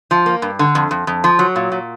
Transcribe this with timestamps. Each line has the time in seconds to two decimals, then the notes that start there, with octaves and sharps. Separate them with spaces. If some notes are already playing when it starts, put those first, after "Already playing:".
0.11 F3
0.26 A#3
0.42 G2
0.59 D3
0.75 F2
0.91 F2
1.07 F2
1.24 F3
1.39 F#3
1.56 A#2
1.72 A#2